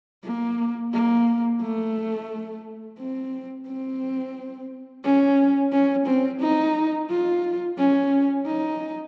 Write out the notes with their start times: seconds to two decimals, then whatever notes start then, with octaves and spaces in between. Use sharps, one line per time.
0.24 A#3
0.93 A#3
1.62 A3
2.99 C4
3.67 C4
5.05 C#4
5.72 C#4
6.07 C4
6.41 D#4
7.10 F4
7.78 C#4
8.46 D#4